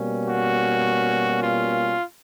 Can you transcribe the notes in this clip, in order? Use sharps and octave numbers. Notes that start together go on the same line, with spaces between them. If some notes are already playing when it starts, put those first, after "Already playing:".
Already playing: B2 G3 A#3 C#4
F#4
F4